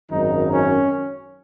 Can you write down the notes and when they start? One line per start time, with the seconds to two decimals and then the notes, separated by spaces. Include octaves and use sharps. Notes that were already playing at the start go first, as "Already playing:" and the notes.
0.11 G#1 F#2 D#3 D#4
0.53 C#4